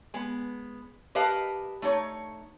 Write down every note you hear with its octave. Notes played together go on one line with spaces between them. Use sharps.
G#3 B3
G4 A#4 B4 D#5 F5 A5
A3 D#4 C#5